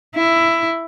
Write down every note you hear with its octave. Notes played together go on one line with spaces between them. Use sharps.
E4